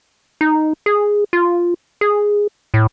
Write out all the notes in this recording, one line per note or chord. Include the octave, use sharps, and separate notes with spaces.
D#4
G#4
F4
G#4
A2